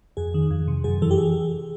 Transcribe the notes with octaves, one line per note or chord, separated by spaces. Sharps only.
F2 G#4
D#3
F2
C3
F#2 G#4
E3 A4
G4
G#4